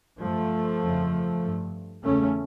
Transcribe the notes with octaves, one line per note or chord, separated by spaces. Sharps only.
G2 F3 A3
F2 C#3
G2
E2 C#3 A3 C#4